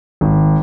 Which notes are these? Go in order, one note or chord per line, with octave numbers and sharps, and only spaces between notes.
G#1